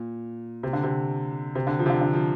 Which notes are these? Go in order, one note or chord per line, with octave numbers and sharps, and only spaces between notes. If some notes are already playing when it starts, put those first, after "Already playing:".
Already playing: A#2
C3
D3
C3
C3
D3
F3
C3
D3
D3
F3